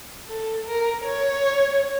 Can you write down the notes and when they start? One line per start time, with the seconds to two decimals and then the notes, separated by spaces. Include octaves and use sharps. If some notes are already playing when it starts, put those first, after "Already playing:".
0.28 A4
0.67 A#4
1.05 C#5